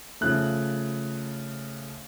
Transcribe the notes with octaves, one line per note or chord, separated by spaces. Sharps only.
C#3 F3 A3 F#6